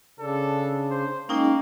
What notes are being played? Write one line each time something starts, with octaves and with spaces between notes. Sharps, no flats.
C#3 D4 A4
C5
G#3 A#3 C#4 D#4 G5